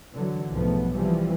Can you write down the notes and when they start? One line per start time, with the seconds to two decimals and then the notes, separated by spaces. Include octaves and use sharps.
0.14 D3 E3 F#3
0.51 B1 G#2 B2 F3 A3 B3
0.92 C3 E3 F3 G3